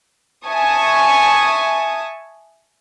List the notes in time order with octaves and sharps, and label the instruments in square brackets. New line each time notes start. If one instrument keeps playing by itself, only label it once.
[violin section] E5 G#5 A5 C#6 D#6